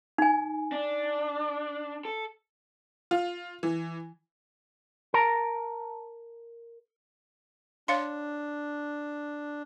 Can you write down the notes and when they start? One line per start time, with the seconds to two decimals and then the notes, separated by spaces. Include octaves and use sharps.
0.18 D#4 G#5
0.72 D4
2.05 A4
3.11 F4
3.63 E3
5.14 A#4 A5 A#5
7.88 D4 C#5 F5 C6